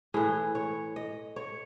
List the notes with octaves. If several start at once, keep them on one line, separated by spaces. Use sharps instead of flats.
A2 E3 G#4
C#5
D#5
C#5